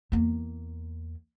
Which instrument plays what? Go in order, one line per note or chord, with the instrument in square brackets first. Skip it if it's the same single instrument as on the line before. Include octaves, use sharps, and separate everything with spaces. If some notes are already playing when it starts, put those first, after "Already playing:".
[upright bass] E2 A#3